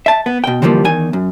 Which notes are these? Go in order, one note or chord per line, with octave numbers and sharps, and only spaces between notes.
E5 A5
B3
B2 G5
D3 E3 F3 G3 A#3
E2 D#3 G#5
F#2